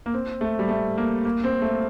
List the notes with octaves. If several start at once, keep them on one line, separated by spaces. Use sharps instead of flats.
A#3
C4
A3
G3
A3
A#3
A#3
C4
A3